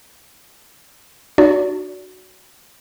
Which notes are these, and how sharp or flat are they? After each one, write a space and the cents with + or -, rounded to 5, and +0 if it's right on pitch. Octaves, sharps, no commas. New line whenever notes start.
D4 +40 F#4 +0 D5 -40